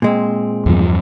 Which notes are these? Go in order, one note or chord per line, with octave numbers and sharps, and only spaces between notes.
A#2 G#3 C4
E2 G2 F3